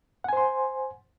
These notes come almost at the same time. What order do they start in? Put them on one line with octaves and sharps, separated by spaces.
F#5 G#5 C5 C6